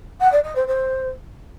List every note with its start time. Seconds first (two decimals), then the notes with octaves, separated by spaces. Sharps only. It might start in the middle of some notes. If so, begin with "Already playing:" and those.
0.20 F#5
0.32 D5
0.43 D#5
0.55 C5
0.67 C5